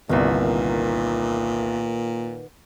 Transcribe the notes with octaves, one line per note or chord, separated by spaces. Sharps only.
G1 C2 A#2 D#3 B3